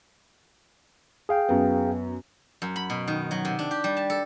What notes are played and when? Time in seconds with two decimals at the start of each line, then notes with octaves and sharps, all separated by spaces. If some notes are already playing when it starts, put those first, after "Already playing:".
1.29 G#4 F5 G5
1.49 F#2 B3
2.62 F#2
2.76 B5
2.90 B2
3.08 D#3
3.31 F#3
3.45 C3
3.59 D4
3.71 G4
3.84 G3
3.97 A5
4.10 A4